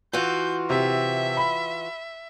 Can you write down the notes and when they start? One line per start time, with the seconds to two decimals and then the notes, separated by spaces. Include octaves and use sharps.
0.13 E3 F4 F#4 G6
0.70 C3 E5
1.37 B5